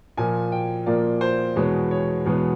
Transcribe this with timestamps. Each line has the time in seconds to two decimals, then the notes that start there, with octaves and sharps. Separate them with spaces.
0.17 A#2 F3 A#3 G#5
0.52 G5
0.86 A#2 F3 A#3 D5
1.21 C5
1.56 E2 B2 G#3 B3 C#5
1.91 C#5
2.26 E2 B2 G#3 B3